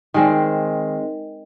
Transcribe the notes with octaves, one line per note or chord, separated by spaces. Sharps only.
D#3 G#3 C4